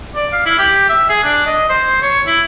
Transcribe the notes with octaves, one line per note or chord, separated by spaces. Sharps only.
D5
F5
E4
G4
E5
G#4
D4
D#5
C5
C#5
E4